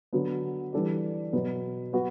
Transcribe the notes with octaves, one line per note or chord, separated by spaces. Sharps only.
D3 F#3 B3
E3 G3 D4 A4 D5
B2 F#3 B3
F#3 B3 F#4 B4